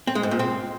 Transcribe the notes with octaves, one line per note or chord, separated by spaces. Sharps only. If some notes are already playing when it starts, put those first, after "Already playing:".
C4
G#3
G#2
A#2
C4